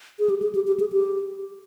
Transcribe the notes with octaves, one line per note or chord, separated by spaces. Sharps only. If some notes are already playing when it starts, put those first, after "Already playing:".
G#4
G4
G#4
G4
G4
G#4
G4